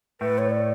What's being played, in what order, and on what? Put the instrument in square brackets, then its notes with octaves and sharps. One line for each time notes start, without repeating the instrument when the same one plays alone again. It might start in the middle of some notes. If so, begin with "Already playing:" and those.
[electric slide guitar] A2 A3 [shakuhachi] B4
[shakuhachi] C#5
D5